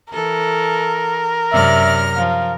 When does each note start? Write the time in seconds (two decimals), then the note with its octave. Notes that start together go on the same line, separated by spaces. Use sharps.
0.13 E3 A4 A#4
1.52 F#2 C3 D5 E5 F6 A#6
2.17 F3 F5